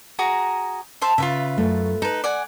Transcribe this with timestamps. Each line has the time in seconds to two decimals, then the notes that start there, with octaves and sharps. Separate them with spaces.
0.19 F#4 G#4 A#5
1.01 C5 E5 A5
1.18 C#3 F4 B4 E5
1.58 F#2 A3
2.02 D#4 B4 A5
2.24 D5 F#5 G#5